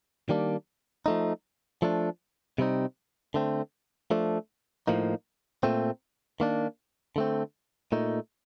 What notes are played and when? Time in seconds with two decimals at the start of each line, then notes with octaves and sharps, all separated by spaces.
0.29 D#3 G3 A#3 D4
1.06 F3 A3 D#4
1.82 F3 A3 D4
2.58 C3 G3 C4 D#4
3.34 D3 A3 C4
4.11 F3 A3 D4
4.87 A2 F3 A#3 D#4
5.63 A#2 A3 C4
6.40 D#3 A#3 D4
7.16 D3 A3 C4
7.92 A#2 A3 D#4